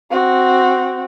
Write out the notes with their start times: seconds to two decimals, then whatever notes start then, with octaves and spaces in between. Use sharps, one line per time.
0.11 C4 F#4